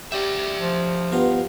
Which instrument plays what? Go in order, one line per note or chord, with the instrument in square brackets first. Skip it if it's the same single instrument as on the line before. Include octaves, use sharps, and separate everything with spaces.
[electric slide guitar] D4 D5 E5 [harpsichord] G4
[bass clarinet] F3
[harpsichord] G2 F4 A#5 [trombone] B3